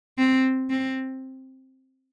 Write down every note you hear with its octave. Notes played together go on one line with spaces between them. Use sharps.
C4
C4